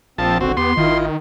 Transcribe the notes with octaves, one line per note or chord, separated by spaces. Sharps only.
A#1 F3 C4 A5
D#1 A1 D3 C4 F#4
E2 B3 G4 C6
G#1 D#3 E4 F4 D#5